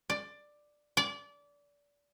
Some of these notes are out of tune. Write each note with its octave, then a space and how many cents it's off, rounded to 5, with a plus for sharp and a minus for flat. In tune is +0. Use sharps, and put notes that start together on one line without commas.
D5 +10
D5 -25